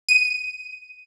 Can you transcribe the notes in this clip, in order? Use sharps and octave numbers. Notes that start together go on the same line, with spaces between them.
D#7